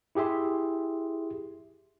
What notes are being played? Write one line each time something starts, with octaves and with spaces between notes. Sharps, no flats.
E4 G4 G#4 E5 C6